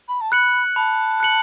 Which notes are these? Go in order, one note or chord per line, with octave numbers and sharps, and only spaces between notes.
B5
A5
B5 F#6 C#7 F#7
A5 B5
F#6 C#7 F#7